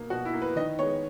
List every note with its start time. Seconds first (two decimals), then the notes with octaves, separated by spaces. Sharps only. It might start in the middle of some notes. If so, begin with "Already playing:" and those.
Already playing: B2 A#3
0.10 B2 F#4
0.25 E4
0.34 A#3
0.42 B4
0.56 D#3 D#5
0.79 G#3 B3 C#5